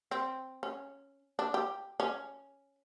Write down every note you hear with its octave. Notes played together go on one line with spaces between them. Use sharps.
C4
C#4
D4
G4
C#4